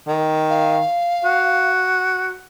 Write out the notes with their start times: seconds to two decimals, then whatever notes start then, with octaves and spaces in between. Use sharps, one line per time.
0.07 D#3
0.50 F5
1.24 F#4